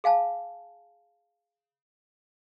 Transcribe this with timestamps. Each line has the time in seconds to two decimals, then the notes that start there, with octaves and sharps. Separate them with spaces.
0.04 G#4 F5 G#5 A5